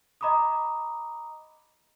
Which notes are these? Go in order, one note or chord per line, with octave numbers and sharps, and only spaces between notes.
D#5 A#5 B5 D6 D#6